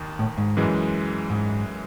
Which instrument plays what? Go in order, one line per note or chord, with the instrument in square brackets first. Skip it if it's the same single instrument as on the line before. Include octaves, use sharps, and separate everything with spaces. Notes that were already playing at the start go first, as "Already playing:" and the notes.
Already playing: [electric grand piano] D#2 D#3
[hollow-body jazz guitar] A2
G#2
[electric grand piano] F#2 E3 G#3
[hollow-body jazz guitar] G#2